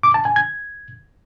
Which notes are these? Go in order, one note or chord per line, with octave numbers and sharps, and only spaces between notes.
D6
A5
G#5
G#6